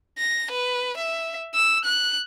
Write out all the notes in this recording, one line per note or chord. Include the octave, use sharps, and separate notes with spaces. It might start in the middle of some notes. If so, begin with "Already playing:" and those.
A#6
B4
E5
E6
F#6